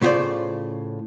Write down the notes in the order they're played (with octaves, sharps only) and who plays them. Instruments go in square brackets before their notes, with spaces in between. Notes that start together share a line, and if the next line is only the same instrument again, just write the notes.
[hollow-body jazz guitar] A2 C#3 F4 F#4 C5 D5